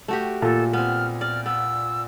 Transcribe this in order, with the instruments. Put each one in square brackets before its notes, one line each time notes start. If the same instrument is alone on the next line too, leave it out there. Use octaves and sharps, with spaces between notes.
[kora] A3 F#4 G4
[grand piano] A#2 [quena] A4
[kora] B3 C4 [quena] F6
[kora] D5 [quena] F6
[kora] B3 [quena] E6